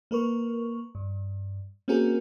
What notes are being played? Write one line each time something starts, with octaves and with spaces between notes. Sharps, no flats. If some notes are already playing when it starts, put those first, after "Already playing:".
A#3 A#4 B4 C#6
G2
A#3 C4 C#4 F#4 G#4 A#4